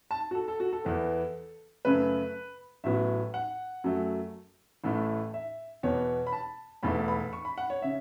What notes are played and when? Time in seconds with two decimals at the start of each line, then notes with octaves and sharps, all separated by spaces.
0.11 A5
0.31 F#4
0.35 A4
0.48 A4
0.60 F#4
0.73 A4
0.85 E2 E3 B3
1.85 F#2 C#3 A3 B4
2.84 A1 A2 F#3 B3 E5
3.34 F#5
3.84 F#2 F#3 A3
4.84 A1 A2 A3
5.34 E5
5.83 E2 B2 B3 C#5
6.27 B5
6.33 A5
6.83 E1 E2 E3 A3 B5
7.08 B5
7.33 C#6
7.45 B5
7.58 F#5
7.70 C#5
7.82 C#3 E5